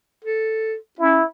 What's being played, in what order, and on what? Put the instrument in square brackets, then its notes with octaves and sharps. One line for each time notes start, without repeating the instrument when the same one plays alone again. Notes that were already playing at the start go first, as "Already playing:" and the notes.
[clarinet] A4
[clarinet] C#4 [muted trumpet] E4